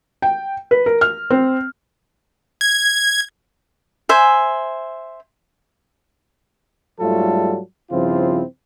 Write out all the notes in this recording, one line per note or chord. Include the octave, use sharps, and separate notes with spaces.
G5
B4
A#4
F6
C4
G#6
C5 E5 G#5
G#2 F#3 G3 A3 F4 A4
G2 C#3 F3 C4 E4 F4